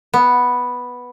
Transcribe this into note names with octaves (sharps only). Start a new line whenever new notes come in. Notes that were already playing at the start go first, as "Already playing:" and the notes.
B3